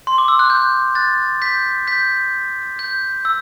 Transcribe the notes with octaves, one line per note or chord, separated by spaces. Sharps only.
C6
D6
E6
F#6
G6
F#6 A6
G6 B6
G6 B6
G6
E6